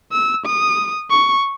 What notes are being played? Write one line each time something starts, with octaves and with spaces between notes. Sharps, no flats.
E6
D#6
C#6